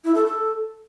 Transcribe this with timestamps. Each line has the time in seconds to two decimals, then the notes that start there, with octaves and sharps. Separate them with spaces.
0.04 E4
0.15 A4
0.25 A4